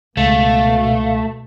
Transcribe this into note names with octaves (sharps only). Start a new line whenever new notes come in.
C#2 B2 A3 F5